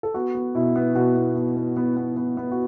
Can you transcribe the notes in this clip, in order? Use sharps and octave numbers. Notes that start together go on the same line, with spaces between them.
A4
B3 F#4
B3
B2 E4
B3
B2 F#4
B3
B3
B3
B3
B3
B3
B3
F#4